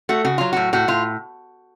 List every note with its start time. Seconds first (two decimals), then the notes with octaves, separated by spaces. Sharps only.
0.09 A3 F#4
0.25 C#3 F#4
0.38 F#3 F4
0.53 A2 F#4
0.73 A2 F#4
0.88 A2 F4